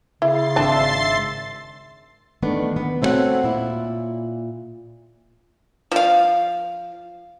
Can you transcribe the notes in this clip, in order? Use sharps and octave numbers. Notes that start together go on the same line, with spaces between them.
C#3 E4 C6 A6 C7
G#1 D4 E5 A5 E6
D#3 A3 B3 D4
B3
A3 C4 E4 F#4 C#5 F#5
A#2 E4
F3 F5